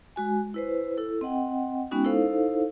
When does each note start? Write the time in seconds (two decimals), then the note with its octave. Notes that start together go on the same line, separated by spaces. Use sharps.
0.16 G#3 F#4 G#5
0.54 E4 B4 C5
0.97 E4 A4
1.21 C4 D#5 F#5 G5
1.91 G#3 B3 C#4 D#4 F#4 G5
2.04 D#4 E4 A4 C5 F5